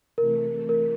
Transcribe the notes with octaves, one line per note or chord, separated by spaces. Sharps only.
C3 E3 A3 A#4
A#4